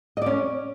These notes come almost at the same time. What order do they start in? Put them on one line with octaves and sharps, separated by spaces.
D#5 D5 C#4